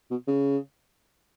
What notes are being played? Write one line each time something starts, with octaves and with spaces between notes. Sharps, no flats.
B2
C#3